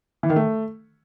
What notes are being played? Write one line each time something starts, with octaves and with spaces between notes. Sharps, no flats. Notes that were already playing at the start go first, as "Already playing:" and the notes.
E3
D#3
A3